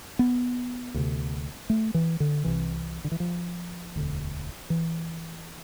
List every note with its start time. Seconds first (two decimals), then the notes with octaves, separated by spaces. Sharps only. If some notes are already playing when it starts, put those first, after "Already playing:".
0.19 B3
0.94 D2 C3
1.70 A3
1.94 E3
2.20 D3
2.44 C2 C3 E3
3.04 D3
3.12 E3
3.20 F3
3.96 E1 D2 D3
4.70 E3